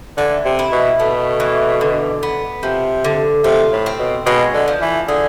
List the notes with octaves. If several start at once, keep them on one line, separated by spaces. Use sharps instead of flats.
D3 E3
C3
E4
B2
B2 A3
E3
D3
B3
C3 F3
D3
C3 F4
A2
C4
B2
B2 G#3
D3
F3
E3
D3 G#4